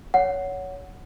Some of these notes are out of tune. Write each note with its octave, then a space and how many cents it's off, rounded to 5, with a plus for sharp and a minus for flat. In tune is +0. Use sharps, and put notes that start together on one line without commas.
C#5 +15 F#5 +0